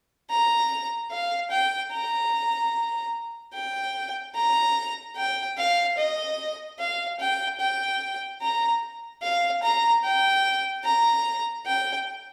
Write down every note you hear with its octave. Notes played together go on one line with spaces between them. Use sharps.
A#5
F5
G5
A#5
G5
A#5
G5
F5
D#5
F5
G5
G5
A#5
F5
A#5
G5
A#5
G5